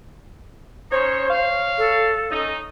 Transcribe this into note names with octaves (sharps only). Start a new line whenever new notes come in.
C#4 D#4 C5 C#5
C#5 F5
A4
C#4 D#4